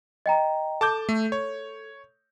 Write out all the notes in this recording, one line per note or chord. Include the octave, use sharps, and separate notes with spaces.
D#5 G5 A#5
A4 A5 D6 G6
A3
C#5